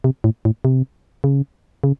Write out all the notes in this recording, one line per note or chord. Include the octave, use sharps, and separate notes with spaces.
C3
A2
A2
C3
C#3
C#3